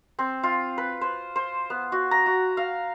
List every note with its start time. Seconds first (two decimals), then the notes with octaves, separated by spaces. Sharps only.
0.19 C4
0.43 F4
0.78 B4
1.01 C5
1.36 C5
1.70 B3
1.92 F#4
2.11 A#5
2.26 F#4
2.57 F5